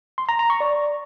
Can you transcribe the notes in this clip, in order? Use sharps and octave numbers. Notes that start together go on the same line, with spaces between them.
C6
A#5
A#5
C#6
D5